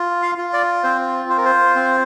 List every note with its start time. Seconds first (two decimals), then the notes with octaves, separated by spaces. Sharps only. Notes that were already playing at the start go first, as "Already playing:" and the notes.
Already playing: F4
0.22 F5
0.38 F4
0.53 D5
0.83 C4 C5
1.29 F4 C5
1.37 A#4
1.45 C5
1.76 C4